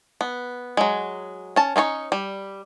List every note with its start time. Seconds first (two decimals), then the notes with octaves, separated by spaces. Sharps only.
0.21 B3
0.77 F#3 G#3
1.56 C#4 A5
1.76 C#4 D#4 F4 C#5
2.12 G3